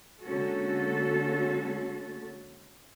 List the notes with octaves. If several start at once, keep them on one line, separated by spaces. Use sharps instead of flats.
D3 G#3 A#3 C#4 F#4 A4